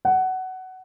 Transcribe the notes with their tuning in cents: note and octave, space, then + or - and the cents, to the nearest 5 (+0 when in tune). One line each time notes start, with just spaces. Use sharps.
F#5 +15